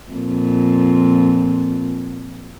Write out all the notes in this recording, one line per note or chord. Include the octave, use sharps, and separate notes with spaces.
F2 A#2